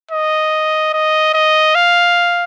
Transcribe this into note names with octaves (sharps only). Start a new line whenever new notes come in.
D#5
D#5
D#5
F5